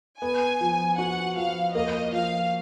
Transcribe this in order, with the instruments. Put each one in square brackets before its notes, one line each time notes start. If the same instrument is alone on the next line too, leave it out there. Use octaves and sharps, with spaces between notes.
[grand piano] B3 [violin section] G#5
[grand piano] F3
[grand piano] F#4 [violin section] F#5
[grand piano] F3 [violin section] F5
[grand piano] A#3 [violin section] D#5
[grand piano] F3 [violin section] F5